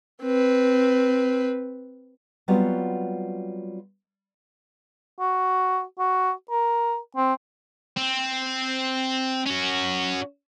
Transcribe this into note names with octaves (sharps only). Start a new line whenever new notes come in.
C4 B4
F#3 G3 B3 C4 F4 F#4
F#4
F#4
A#4
C4
C4
C#4 F#4